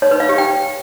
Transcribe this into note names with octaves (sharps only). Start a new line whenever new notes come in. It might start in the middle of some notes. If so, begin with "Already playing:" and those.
C#5
B4
F5
G4
G5